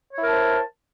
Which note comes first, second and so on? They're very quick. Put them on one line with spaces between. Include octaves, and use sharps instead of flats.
C#5 E4 A#4 A5 C5